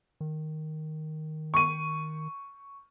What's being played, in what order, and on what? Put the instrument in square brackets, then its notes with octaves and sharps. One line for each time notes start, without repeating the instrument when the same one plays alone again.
[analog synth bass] D#3
[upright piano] C#6 D#7